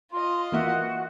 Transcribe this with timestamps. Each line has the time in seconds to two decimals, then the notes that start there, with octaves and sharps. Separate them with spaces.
0.12 F4 D#5 C6
0.52 E3 A#3 F#4 E5